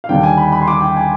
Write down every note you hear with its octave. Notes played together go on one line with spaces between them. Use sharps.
F5
D#2 D3 G3 D4 G5
G#5
B5
B5
C6
D6
G5
G#5